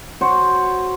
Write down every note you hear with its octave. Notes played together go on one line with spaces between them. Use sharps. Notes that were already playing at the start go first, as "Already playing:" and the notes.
F#4 C5 C#5